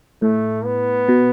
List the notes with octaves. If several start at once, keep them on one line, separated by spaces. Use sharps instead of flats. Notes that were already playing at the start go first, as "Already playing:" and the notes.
A2 A3
B3
B2